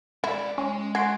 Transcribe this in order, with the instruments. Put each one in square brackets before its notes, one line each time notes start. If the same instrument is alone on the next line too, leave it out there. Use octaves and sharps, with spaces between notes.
[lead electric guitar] G#3 D5 [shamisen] E4
[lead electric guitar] G#3 [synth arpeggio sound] C#4
[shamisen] F#4 [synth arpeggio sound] G#5 C6 D7